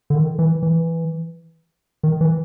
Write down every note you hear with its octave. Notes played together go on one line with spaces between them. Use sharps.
D3
D#3
E3
E3
D#3
E3